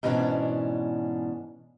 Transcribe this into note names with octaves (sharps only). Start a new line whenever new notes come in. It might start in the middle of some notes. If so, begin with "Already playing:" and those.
G#2 B2 E3 G3 C#4 D4